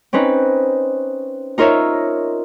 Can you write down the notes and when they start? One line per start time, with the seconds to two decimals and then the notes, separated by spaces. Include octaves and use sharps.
0.13 C4 C#4 D#4 B4
1.58 D#4 F4 A#4 C#5 E5